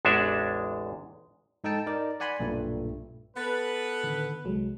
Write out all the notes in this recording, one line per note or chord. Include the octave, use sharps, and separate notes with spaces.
A1 E2 G#3 D4 E5
G#2 D#4 A4 G5 A5
D#4 A#4 D5
D5 F#5 G#5 B5 C6
B1 G2 A#2 G3 A3
B3 A4 B4 A6
A2 D3 D#3
C2 F#3 G#3